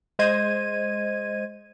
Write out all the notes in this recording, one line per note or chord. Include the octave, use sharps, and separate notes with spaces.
G#3 C5 D#5 G#6 D#7